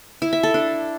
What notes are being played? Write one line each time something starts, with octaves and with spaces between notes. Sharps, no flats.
E4
E5
A4
D4